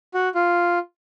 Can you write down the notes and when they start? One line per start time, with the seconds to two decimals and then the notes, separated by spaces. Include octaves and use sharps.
0.14 F#4
0.35 F4